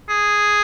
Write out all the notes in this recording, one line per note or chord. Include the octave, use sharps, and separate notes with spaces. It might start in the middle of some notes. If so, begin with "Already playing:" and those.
G#4